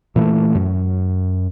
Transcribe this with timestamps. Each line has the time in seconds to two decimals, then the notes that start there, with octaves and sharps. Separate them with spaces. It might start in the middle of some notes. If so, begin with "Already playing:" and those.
0.16 A#2 E3 A3
0.55 F#2